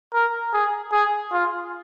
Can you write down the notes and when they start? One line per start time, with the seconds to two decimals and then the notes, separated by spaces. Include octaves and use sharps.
0.14 A#4
0.53 G#4
0.92 G#4
1.33 F4